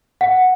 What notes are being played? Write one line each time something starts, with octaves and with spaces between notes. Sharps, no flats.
F#5